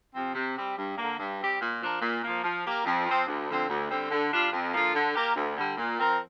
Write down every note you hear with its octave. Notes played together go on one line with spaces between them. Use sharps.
C3 F3 C4
C3
G3 C4 G4
G2
D3 A#3
G2
G3 C4 G4
A#2
F3 D4 F4 A#4
A#2
F3 A#3
F3
A#3 G4 A#4
F2
F3 C4
D2
D3 F3 C4
D2
D3 G3 C4
D3
G3 D4 F4
F2
D3 F3 A#3 F4
D3
A#3 G4 A#4
D2
D3 G3
A#2
F3 C4 A#4